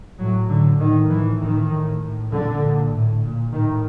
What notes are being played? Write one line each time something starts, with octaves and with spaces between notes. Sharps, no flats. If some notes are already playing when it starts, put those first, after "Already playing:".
A2 F#3
A2 D3
A2 D#3
A2 E3
A2 D#3
A2
A2
A#2 D3
A#2
A2
A#2
A2 D#3